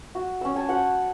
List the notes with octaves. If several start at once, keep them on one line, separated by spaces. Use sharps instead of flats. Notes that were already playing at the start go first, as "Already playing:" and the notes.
F#4
C#4 E6
G#5 A5
F#4 C5 F#5